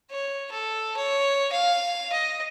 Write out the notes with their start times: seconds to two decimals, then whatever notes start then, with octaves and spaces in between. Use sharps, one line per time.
0.11 C#5
0.51 A4
0.96 C#5
1.52 F5
2.12 D#5